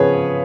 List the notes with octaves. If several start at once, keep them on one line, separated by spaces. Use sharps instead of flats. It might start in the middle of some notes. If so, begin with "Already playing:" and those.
Already playing: C#3 F3 B3 G#4 B4 C#5